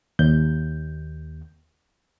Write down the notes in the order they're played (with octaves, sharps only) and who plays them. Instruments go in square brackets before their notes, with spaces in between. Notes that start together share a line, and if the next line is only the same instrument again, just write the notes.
[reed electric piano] D#2 G6